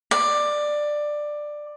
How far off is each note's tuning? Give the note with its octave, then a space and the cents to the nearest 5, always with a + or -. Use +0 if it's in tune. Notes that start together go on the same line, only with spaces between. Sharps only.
D5 +15